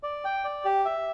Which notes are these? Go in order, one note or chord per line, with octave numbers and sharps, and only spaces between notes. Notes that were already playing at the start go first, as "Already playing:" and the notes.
D5
G5
D5
G4
E5